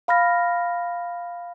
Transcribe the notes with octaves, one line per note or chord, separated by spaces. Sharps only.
F5 B5 F6 A#6